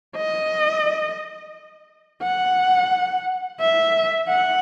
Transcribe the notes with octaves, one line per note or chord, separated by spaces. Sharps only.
D#5
F#5
E5
F#5